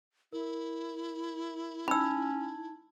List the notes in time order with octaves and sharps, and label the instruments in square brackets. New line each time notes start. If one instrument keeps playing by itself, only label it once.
[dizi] E4 [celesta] A#4
[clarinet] C#4 [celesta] D#4 A5 G#6 [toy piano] B5 E6